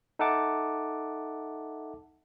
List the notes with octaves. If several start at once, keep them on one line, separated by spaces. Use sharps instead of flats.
D#4 A4 E5 F#5 A5 D6